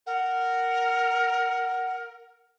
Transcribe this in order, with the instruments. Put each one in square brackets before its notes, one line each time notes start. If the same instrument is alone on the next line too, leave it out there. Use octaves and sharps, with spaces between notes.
[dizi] A#4 [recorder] F#5